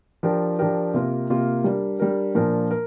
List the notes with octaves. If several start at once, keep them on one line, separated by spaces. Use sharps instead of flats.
F3 D4 G4 A#4
F3 D4 G4 A#4
C3 A#3 F4 A#4
C3 A#3 F4 A#4
G3 D4 A#4
G3 D4 A#4
A#2 F3 D4 A#4
A#4